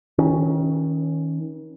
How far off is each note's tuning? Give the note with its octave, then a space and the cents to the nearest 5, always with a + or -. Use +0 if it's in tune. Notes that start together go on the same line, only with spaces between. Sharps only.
D#3 +35 C#4 +0